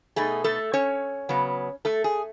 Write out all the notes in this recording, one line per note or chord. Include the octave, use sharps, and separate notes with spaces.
B2 A3 D#4 G#4
A3 A4
C#4 C#5
C#3 F#3 B3
A3 A4
G#4